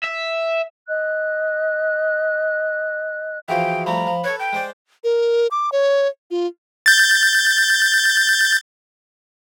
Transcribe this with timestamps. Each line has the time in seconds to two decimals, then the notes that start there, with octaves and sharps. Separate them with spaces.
0.04 E5
0.88 D#5 F#6
3.48 E3 F3 F4 F#4 G#4 E5 G5
3.86 F3 G3 A3 A#5 B5
4.07 F3
4.24 A4 B4 C#5
4.39 G5 G6
4.53 G#3 C5 D5
5.04 A#4
5.51 D6
5.72 C#5
6.31 F4
6.86 G6 A6